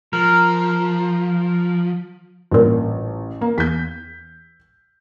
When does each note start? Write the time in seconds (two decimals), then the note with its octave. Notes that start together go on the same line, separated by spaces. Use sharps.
0.13 F3 A#4
2.51 A1 G2 A#2
3.41 A#3
3.58 E2 G6 B6